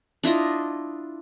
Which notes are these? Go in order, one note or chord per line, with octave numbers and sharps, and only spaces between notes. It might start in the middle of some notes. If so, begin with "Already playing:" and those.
D4 E4 F4 D#5